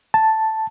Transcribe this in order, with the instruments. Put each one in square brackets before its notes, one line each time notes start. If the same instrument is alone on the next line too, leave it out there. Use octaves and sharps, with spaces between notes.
[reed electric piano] A5